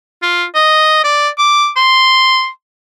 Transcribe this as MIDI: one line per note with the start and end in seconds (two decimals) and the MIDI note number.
0.22 0.45 65
0.55 1.01 75
1.04 1.29 74
1.39 1.70 86
1.77 2.49 84